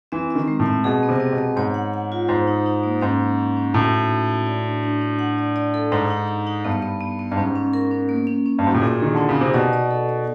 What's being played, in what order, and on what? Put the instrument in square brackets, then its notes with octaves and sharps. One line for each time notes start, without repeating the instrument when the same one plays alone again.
[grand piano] E3 [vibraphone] C4
[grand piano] D#3 [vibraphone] C4
[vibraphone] G#3
[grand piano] A2
[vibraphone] C4
[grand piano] B2 [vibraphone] G#4
[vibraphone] B3
[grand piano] C3
[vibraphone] B3
[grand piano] B2
[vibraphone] B3
[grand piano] G#2 [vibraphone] C#5
[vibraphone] F#5
F#5
F4
[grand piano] G#2 [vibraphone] C5
[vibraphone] D#4
D#4
A#3
[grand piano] G#2 [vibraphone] C#4
[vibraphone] C#4
C#4
C#4
[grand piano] A2 [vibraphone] F#4
[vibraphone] D#4
F#4
F#4
D5
D4
D4
D4
F#5
D5
D5
A4
[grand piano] G#2 [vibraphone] D#4
[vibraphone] D#4
D#4
D#4
[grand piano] G2 [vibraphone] B3
[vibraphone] B3
B3
B3
[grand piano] G2
[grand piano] G#2 [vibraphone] C#4
[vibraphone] C#4
A#4
C#4
A#3
C#4
C#4
[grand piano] G2
[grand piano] G#2 [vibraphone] F#4
[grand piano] A2
[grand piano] A#2 [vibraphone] G#4
[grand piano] D#3 [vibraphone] G#4
[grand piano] D3 [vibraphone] D#4
[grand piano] C#3
[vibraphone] D#4
[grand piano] C3
[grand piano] B2 [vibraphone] D5
[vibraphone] D5
A4
D5